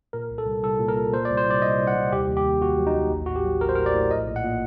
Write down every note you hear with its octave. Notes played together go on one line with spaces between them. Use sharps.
A#2 A#4
C2
A4
C2
C2 A4
A#2
A#4
A#2
A#2 C5
C2 D5
C5
C2 D5
C2 D#5
C2
F#5
C2
D#2 G4
D#2
G4
D#2
D#2 F#4
F#3
D#4
D#2
A1
A2 F#4
G4
F#3
A1 A#4
C5
A2 A#4
D5
A2
A#1 D#5
A#2
F#5
A#2